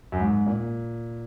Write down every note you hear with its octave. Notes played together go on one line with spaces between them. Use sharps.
F#2
G#2
A#2